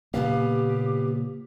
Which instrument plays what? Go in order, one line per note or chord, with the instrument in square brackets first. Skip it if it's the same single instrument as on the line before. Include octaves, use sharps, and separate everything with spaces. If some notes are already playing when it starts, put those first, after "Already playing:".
[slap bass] A#2 C#3 A#3 [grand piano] B3 F5 [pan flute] G4